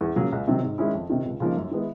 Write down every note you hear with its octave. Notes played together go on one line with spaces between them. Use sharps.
E2
C#3 F#3 A#3
C#2
C3 D#3 F#3
G#2
D#3 G#3 C#4 E4
F2
C3 D#3
C#2
C#3 F3 A#3 D#4
F#2
D#3 G#3 B3 E4